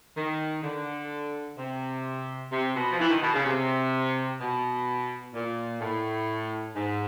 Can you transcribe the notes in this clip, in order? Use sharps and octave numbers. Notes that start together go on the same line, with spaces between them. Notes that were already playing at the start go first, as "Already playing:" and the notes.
D#3
D3
C3
C3
B2
F3
E3
D#3
B2
C#3
C3
B2
A#2
A2
G#2